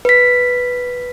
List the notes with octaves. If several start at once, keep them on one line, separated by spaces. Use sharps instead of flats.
B4 B6